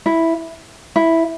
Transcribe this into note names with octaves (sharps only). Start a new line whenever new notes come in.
E4
E4